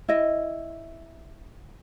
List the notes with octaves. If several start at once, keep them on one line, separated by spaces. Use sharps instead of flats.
E4 D#5